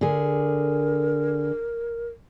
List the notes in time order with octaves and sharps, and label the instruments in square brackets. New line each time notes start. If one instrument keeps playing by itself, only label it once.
[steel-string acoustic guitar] D3 G#4 [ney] A#4